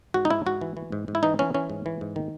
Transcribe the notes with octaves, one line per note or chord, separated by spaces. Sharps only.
G#2 F#4
D#4
G#2 E4
G#2 F#4
E3
E3
G#2
G#2
E4
E3 D#4
E3 C#4
E3 C#4
G#2
E3
G#2
D#3